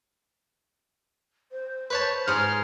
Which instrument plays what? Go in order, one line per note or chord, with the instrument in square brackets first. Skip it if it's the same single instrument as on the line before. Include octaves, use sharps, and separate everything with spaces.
[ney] C5
[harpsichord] B4 C#5 A5
[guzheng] G#2 G#4 [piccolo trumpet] F6